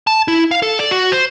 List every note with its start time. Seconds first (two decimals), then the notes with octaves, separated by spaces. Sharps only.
0.07 A5
0.28 E4
0.51 F5
0.62 A4
0.79 D5
0.91 F#4
1.12 C5